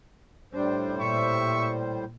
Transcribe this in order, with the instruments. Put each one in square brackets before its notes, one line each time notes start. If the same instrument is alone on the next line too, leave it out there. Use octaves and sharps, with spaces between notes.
[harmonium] A2 G3 C5 [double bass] D4
[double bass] A#2 [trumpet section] E5 C#6